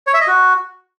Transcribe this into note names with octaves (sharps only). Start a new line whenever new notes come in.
C#5
E5
D#5
F#4